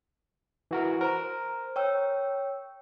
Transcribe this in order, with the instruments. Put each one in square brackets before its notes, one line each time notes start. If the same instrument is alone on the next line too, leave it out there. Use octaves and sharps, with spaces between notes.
[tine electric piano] E3 F#4 A#4
[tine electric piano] A#4 [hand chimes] C5 A#5
[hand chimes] C#5 G5 E6